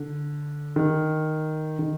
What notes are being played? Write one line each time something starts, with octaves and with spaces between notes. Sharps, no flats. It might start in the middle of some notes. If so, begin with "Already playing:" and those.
Already playing: D3
D#3
D#3